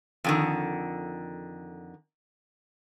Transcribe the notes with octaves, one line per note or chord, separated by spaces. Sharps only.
F2 D3 D#3